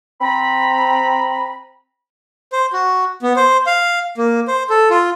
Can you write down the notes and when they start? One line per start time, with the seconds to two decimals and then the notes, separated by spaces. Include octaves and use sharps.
0.21 C4 A#5 B5
2.52 C5
2.73 F#4
3.22 B3
3.36 C5
3.66 F5
4.17 A#3
4.48 C5
4.70 A4
4.90 F4